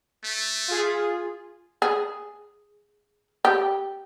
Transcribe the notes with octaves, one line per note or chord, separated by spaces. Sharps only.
A3
F4 G#4
G#4
G4